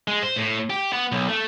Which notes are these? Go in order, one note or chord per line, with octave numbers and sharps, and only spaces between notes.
G#3
C5
A2
G4
B3
B1
A3